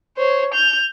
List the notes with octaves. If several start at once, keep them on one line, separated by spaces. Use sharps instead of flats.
C5 C#5
G6 F7